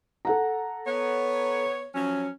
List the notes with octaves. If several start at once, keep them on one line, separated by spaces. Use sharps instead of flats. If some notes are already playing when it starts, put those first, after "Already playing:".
A4 F#5 A#5
B3 C#5
F3 F#3 C#4